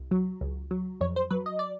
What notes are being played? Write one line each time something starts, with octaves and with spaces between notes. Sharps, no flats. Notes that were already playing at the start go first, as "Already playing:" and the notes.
Already playing: C2
F#3
C#2
F#3
F2 C#5
C5
F#3 B4
D#5
D5